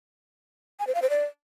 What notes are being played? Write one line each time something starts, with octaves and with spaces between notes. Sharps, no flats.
G#5
C5
F5
C5
D5